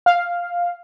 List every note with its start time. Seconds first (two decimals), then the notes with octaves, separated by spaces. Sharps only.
0.06 F5